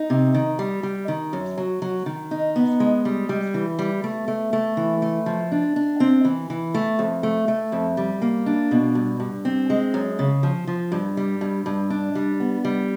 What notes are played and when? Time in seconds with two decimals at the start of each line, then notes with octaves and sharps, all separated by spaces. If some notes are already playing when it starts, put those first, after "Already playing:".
Already playing: D#4
0.10 C3
0.34 D#3
0.59 G3
0.83 G3
1.08 D#3
1.33 F#2
1.58 F#3
1.82 F#3
2.06 D#3
2.31 D#4
2.56 B3
2.80 G#3
3.05 G3
3.29 G3
3.54 E3
3.79 G3
4.04 A3
4.28 A3
4.53 A3
4.77 E3
5.02 A3
5.26 F3
5.52 D4
5.76 D4
6.00 C4
6.25 E3
6.50 E3
6.74 A3
6.99 F2
7.23 A3
7.48 A3
7.72 F2
7.97 G3
8.22 A#3
8.46 D4
8.71 B2
8.95 G2
9.20 G2
9.45 C4
9.70 G#3
9.94 F#2
10.19 C#3
10.43 F3
10.67 F3
10.92 G2
11.17 G3
11.41 G2
11.66 G2
11.90 D4
12.15 G3
12.40 B3
12.65 G3